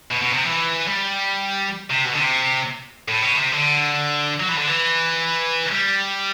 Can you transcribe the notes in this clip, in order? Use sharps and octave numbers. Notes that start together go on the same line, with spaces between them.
B2
B2
C3
E3
G3
C3
B2
D3
C3
A2
B2
C3
D3
F#3
E3
D3
E3
G3